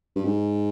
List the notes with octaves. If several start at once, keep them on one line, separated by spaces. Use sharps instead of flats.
G2
G#2